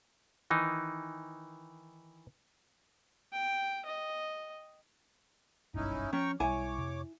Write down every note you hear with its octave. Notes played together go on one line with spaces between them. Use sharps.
D#3 E3 D#4
G5
D#5
F#1 B1 G2 C#4 D#4 E4
F3 C#4 G5 A#5 C#6
B1 G3 E4 C#5 G#5 D6
F2 C3